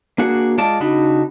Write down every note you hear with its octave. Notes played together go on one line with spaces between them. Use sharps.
A#3 D4 F#4 G#4 F#5
G#3 F4 D5 A5
C#3 D4 D#4 F#4 B5